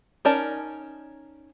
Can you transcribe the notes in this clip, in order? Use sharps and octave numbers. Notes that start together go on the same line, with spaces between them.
C#4 D#4 A#4 D5 A5